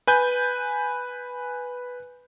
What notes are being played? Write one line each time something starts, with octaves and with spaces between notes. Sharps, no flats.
B4 G#5 G6